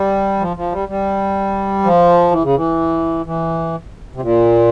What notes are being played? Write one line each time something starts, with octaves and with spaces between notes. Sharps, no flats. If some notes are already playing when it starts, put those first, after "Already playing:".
Already playing: G3
F3
F3
G3
G3
F3
E3
C#3
E3
E3
C3
A#2